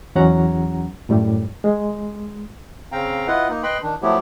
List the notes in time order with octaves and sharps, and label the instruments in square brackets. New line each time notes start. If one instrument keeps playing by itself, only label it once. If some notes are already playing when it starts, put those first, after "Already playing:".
[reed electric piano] E2 F#3 C#4 F#5 A#5
F#2 A2 G3
G#3
[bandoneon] C#3 C4 F5 G5 A#5
E4 F4 B4 D#5 F#5
A#3 D#4
B4 D#5 G5 B5 C6
D#3 D4
F3 F#3 A3 B3 E4 G4